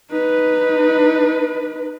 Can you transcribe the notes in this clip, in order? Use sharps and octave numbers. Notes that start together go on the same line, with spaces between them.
D#4 B4